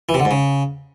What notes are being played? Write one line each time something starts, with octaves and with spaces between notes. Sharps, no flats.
E3
C3
D3
G#2
C#3